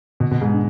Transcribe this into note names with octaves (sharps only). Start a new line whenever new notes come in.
B2
B2
G#2
D3